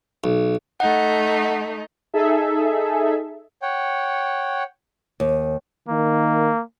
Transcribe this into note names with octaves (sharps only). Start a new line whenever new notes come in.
B1
A3 D#4 F#5
D#4 G#4 A4 E5
C#5 F#5 G5
D#2
D#3 A#3